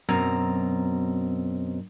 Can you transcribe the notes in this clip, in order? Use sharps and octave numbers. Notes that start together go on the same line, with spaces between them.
F#2 B2 C4 A#5